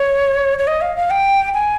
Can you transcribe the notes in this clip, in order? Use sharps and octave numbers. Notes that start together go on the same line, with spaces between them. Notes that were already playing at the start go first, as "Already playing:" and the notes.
Already playing: C#5
C#5
D#5
F5
F5
G5
G#5